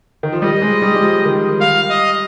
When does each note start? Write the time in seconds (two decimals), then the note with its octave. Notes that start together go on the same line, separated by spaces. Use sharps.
0.23 D#3
0.33 F3
0.42 G3 D#5
0.62 G#3
0.82 G3
0.95 G3
1.02 F3
1.25 D#3
1.31 F3
1.60 G3 F5
1.90 D#5